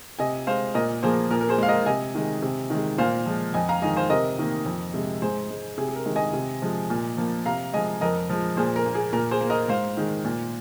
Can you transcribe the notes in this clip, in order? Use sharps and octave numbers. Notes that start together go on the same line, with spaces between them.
C3 D#5 G#5
G#3 C5 F5
A#2 A#4 D#5
F3 A#3 G#4 C5
A#2 A#4
A#4
G#4 C5
G#3 F5
A#4 D#5
C3 D#5 G#5
D#3 G#3
C3
D#3 G#3
A#2 C5 F5
F3 G#3
F2 D#5 G#5
F5 A#5
D#3 G#3 D#5 G#5
C5 F5
C3 A#4 D#5
D#3 A#3
F2
C3 G#3
G#2 G#4 C5
G#3
C3 G#4
G#4
A#4
D#3 G#3
D#5 G#5
C3
F3 G#3
A#2
F3 A#3
C3 F5 A#5
F3 G#3 D#5 G#5
F2 A#4 D#5
F3 G#3
A#2 G#4 C5
A#4
A#3
G#4
A#2 A#4
G#4 C5
A#3
A#4 D#5
G#2 C5 F5
D#3 G#3
A#2